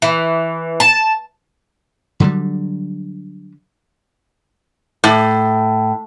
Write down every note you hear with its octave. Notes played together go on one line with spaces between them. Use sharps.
E3
A5
D3 F#3 G3
A2